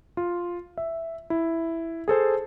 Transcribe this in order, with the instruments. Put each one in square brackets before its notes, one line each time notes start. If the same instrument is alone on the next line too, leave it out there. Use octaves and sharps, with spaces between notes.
[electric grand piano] F4
E5
E4
G#4 A4 C5 A5